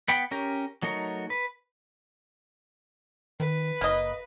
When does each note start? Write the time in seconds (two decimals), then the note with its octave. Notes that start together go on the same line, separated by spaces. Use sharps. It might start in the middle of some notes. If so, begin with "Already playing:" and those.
0.08 B3 F#5 G5 B5
0.31 C#4 G4 A#4
0.82 F#3 A3 D#4 A#4 C#5
1.30 B4
3.40 D#3 B4
3.81 F#1 A#3 D#5